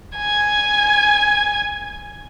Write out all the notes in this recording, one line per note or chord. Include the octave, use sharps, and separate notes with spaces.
G#5 G#6